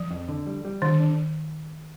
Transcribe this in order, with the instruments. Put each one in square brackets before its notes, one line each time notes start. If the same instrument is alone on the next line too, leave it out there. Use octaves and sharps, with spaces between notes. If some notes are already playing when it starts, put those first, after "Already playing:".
Already playing: [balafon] F3
[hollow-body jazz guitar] F2
D3
G3
G3
[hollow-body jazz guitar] D3 [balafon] D#3
[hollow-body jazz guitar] D4